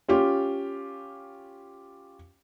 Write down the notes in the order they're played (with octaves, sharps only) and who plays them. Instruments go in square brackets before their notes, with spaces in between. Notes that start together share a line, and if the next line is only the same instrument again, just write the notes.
[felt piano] C#4 F4 G4